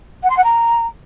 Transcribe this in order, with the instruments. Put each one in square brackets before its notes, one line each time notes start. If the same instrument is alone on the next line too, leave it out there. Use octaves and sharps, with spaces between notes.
[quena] F#5
C6
F#5
A#5